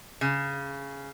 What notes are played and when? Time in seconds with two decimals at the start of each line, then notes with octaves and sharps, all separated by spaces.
0.21 C#3